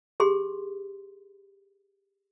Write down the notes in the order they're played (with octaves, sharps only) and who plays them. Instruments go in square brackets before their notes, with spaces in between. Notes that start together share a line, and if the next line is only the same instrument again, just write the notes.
[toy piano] G4 G#4 C6